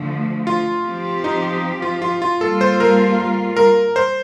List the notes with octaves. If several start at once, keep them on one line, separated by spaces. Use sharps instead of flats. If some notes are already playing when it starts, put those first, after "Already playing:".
Already playing: D3 F3 A3
F4
F3 C4 G4
D#4
F4
F4
F4
G3 A#3 F4 A4
C5
A#4
A#4
C5